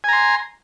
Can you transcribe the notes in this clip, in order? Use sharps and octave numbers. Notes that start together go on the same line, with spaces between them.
G#5 A#5 C6